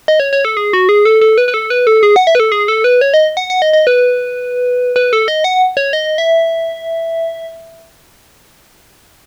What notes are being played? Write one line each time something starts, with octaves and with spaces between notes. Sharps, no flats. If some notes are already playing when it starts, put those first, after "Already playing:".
D#5
C#5
C#5
A4
G#4
F#4
G#4
A4
A4
B4
B4
A4
B4
A4
G#4
F#5
E5
B4
A4
G#4
A4
B4
C#5
D#5
F#5
F#5
D#5
D#5
B4
B4
A4
D#5
F#5
C#5
D#5
E5